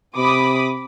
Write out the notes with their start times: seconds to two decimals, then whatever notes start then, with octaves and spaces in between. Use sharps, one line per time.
0.17 C3 B5 D6 D#6